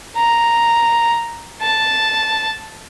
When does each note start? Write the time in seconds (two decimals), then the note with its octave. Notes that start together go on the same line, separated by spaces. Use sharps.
0.17 A#5
1.62 A5